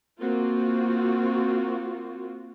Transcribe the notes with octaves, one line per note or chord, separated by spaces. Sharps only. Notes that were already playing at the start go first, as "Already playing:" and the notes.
A#3 C4 F4 F#4